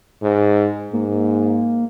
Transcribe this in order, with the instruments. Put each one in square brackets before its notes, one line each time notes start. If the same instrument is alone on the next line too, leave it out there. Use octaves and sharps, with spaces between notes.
[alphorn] G#2
[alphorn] G#2 [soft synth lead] A#3